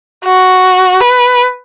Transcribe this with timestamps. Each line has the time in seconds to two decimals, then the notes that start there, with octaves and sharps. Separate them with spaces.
0.25 F#4
1.01 B4